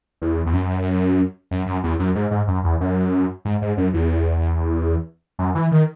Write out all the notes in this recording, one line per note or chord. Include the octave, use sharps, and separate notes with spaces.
E2
E2
F#2
F#2
F#2
E2
F#2
G#2
G#2
F#2
E2
F#2
G#2
G#2
F#2
E2
F#2
E3
D#3